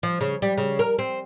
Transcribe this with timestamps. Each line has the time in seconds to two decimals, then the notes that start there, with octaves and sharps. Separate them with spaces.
0.03 F3
0.21 C#3
0.42 G3
0.58 C#3
0.79 A#4
0.99 C4